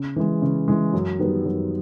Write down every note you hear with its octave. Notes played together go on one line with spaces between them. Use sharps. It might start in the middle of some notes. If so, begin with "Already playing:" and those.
Already playing: C#3
E3 G#3
C#3
E3 G#3
F#2
D#3 G3 B3
F#2